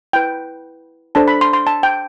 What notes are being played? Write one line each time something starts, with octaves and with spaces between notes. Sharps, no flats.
E4 B4 G5
D4 A4 C5 A5
B5
C6
C6
A5
G5